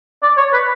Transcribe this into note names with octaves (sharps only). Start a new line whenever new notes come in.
D5
C#5
B4